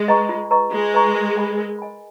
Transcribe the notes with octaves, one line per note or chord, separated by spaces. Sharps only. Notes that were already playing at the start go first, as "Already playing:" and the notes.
Already playing: G#3
B4 D#5 A#5 C#6
F4
B4 D#5 A#5 C#6
G#3 F4
B4 D#5 A#5 C#6
A#4
D#5 G#5 B5
A#4
D#5 G#5 B5